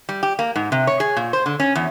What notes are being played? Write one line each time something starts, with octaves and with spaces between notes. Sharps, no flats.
G3
G4
A#3
G#2
C3
C#5
G#4
A#2
C5
D3
C#4
E2